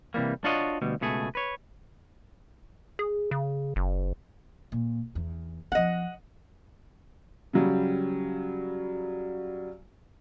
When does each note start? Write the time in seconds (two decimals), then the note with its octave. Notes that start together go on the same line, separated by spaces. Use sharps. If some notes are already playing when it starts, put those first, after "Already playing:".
0.14 C3 E3 G3 A#3
0.44 D4 F4 F#4 C#5 D#5
0.82 D2 B2 G3
1.01 C#2 B2 A3 G#4
1.35 B4 C#5
2.99 G#4
3.31 C#3
3.76 F#1
4.72 A#2
5.15 E2
5.72 F3 C4 D#5 F#5
7.53 C#3 F#3 G3